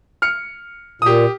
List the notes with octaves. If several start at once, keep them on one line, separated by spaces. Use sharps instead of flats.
F6 C#7
A#2 G4 D#6